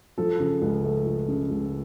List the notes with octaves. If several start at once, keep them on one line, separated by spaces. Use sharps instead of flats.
F3 A4
C#3
C#2
A3
F3
C#3
C#2